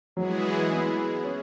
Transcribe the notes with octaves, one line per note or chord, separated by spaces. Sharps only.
E3 F#3 G#3 B3 E4 G#4
B3
C#4